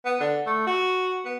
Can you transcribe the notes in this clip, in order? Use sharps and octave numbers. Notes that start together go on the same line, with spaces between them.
B3
D3
A3
F#4
B3